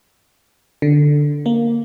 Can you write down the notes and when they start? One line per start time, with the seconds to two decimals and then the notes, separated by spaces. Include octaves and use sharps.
0.82 D3
1.46 A#3